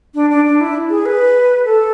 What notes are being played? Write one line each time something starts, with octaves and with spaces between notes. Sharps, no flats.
D4
D4
D4
E4
G#4
B4
A4